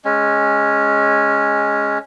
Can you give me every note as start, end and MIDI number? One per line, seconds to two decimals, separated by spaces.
0.05 1.98 56
0.05 1.98 61